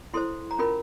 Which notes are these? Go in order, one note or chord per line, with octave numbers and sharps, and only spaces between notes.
E4 A4 C5 C6
A#5
C#4 F4 A#4 B5